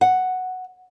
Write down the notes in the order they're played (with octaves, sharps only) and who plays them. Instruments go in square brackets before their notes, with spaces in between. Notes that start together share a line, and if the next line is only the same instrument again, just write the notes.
[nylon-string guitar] F#5